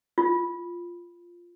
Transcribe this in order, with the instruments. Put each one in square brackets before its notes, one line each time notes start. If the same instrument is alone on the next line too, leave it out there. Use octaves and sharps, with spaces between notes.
[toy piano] F4